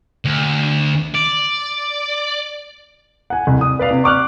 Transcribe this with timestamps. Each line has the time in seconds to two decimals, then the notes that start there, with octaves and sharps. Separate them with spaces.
0.25 D2
1.15 D5
3.30 F#5 G#5
3.47 C2
3.61 D#6
3.79 B4 D5 F5
3.91 C3
4.04 C#6 D6 F6 F#6